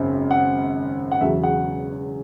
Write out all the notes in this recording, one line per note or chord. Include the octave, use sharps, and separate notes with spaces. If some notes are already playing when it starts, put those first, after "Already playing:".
Already playing: G#1 F#2 C#3
F#5
F#5
E1 E2 C#3 F#3 E5
F#5